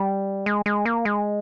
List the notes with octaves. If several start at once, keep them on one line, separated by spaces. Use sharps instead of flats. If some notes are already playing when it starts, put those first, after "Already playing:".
Already playing: G3
G#3
G#3
A#3
G#3